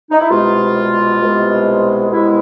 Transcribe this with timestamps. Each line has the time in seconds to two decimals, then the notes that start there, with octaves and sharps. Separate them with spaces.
0.11 D#4
0.19 E4
0.30 C2 B2 G#3 F4
1.20 C2 B2 G#3
2.11 C2 B2 G#3 E4